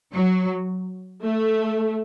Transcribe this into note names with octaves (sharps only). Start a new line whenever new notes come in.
F#3
A3